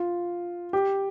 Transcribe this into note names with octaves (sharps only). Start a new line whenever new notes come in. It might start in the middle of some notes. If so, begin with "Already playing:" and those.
Already playing: F4
G4